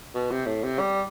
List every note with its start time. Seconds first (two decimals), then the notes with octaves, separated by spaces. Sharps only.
0.15 B2
0.31 C3
0.46 A2
0.64 C3
0.79 G3